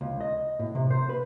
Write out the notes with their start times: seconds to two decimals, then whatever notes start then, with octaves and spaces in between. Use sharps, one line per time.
0.01 C#2
0.21 D#5
0.59 A2
0.75 C3
0.91 C5
1.09 B4